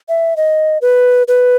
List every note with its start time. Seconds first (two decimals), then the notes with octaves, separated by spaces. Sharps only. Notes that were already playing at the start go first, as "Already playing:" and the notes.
0.09 E5
0.37 D#5
0.82 B4
1.28 B4